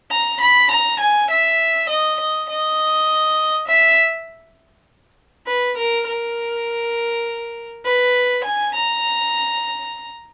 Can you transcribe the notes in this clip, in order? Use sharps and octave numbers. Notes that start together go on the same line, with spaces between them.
A#5
B5
A#5
G#5
E5
D#5
D#5
D#5
E5
B4
A#4
A#4
B4
G#5
A#5